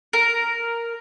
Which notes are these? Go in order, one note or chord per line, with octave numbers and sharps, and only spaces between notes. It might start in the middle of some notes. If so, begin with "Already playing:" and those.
A#4